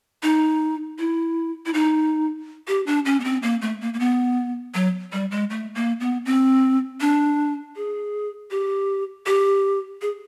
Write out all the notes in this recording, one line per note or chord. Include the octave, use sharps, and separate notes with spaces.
D#4
E4
E4
D#4
G4
D4
C#4
B3
C4
A#3
A3
A#3
A#3
B3
F#3
G3
G#3
A3
A#3
B3
C4
D4
G#4
G4
G4
G#4